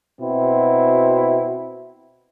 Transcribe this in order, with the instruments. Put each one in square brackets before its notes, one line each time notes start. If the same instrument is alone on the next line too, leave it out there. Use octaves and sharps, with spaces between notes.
[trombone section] B2 C4 E4 F#4